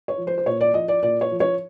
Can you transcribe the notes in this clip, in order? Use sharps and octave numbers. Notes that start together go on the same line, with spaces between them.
C#5
F3
C5
C5
A#2 C#5
D5
F3 D#5
D5
A#2 D5
C#5
F3
C#5